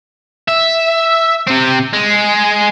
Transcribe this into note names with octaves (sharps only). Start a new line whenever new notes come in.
E5
C3 C4
G#3